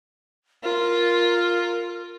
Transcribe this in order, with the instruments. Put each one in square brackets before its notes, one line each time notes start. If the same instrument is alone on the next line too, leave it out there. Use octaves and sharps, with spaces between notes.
[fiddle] F4 [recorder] A#4